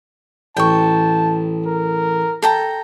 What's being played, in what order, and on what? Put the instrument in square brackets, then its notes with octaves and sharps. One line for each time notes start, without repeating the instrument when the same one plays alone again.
[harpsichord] A1 [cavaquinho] G5 C#6 [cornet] A5
[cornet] A#4
[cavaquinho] A4 G5 A#5